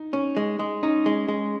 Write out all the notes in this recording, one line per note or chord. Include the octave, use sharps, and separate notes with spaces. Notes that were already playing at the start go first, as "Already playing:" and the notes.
Already playing: D#4
C#4
G#3
G#3
C#4 D#4
G#3
G#3